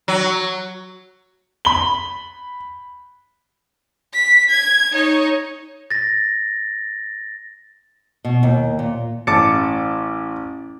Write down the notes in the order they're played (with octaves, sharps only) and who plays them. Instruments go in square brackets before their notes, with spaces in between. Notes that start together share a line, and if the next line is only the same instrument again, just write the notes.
[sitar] F#3
[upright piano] B5 G7
[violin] B6
G#6
D#4 C#5
[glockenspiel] A6 A#6
[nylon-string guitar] B2
D#2
A#2
[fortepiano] A1 A5 [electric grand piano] D6 A6 C#7